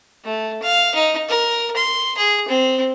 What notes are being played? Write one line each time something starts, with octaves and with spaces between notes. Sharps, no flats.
A3
F5
D#4
A#4
C6
G#4
C4